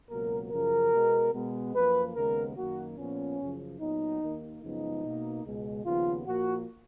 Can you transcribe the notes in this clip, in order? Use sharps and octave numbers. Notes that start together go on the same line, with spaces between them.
C#2 B2 F#3 A#3 A#4
F#2 C#3 F3 A#4
B2 G#3 B3
B2 G#3 B3
F#2 F3 A#3 B4
D#2 C#3 G#3 B3 A#4
F#2 D#3 A#3 F#4
A#2 F3 B3 C#4
F#2 C#3 F3
A#2 F#3 B3 D#4
D#2 D#3 A#3
F#2 C#3 F3 G#3 B3 D#4
B2 A#3
C#2 B2 G#3
D#2 C#3 F3 B3 F4
A#2 F3 A#3 F#4